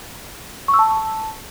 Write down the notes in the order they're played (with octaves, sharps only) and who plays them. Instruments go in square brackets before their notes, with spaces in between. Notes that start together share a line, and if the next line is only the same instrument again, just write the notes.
[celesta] C#6
E6
A5